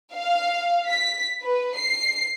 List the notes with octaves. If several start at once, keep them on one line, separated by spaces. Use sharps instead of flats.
F5
B6
B4
C7